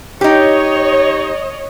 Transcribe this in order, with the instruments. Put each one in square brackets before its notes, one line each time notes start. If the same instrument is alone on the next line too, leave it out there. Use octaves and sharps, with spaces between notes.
[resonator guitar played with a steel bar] D#4 G4 [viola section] C#5 D#5